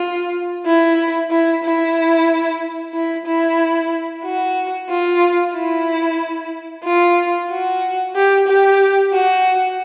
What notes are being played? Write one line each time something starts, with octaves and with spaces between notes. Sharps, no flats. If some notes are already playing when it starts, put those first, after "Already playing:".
Already playing: F4
E4
E4
E4
E4
E4
F#4
F4
E4
F4
F#4
G4
G4
F#4